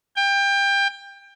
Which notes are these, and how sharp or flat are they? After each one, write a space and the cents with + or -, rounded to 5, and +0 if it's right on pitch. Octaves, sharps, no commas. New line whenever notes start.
G5 +25